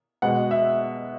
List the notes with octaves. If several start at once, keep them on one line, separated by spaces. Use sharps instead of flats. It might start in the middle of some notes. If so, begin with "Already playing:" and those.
B2 G#3 B3 F#5
E5